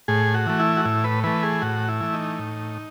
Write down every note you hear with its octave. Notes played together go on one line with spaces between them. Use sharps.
A2 G#4
F#4
E3 A3
E4
F#4
A2 E4
B4
E3 A3 B4
G#4
A2 F#4
E4
E3 A3
D#4
A2